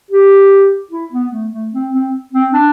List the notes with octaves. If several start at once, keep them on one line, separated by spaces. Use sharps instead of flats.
G4
E4
B3
A3
A3
C4
C4
C4
D4